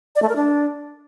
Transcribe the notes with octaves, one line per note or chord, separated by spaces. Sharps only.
D5
A3
A#4
D4